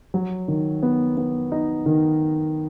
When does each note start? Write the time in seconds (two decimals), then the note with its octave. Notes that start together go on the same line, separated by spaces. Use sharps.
0.14 F#3
0.48 D#3
0.83 B3
1.17 B3
1.52 D#4
1.86 D#3